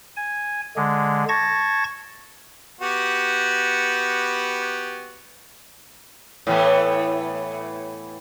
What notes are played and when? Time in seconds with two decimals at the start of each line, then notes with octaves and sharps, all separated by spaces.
0.17 G#5
0.76 D3 G#3
1.29 A5 C#6 G#6 A#6
2.81 B3 F#4 G4
6.47 A2 E3 B3